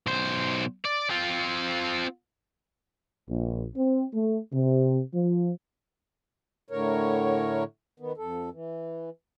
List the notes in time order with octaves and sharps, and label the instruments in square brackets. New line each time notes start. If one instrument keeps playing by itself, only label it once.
[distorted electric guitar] B1 C5
D5
C4 F4
[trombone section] A#1
C4
A3
C3
F3
[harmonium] A2 D3 A#4 C#5
D#3 B3
F2 A4
E3